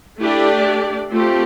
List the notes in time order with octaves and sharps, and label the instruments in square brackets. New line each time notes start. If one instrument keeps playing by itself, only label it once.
[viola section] A3 D4 G4 D5 [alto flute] E4
[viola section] A3 C4 G4 [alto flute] F4